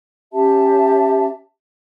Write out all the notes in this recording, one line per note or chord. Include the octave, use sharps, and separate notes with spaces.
C#4 G4 E5 A5